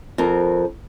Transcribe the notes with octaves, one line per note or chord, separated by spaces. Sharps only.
F2 C4 A#4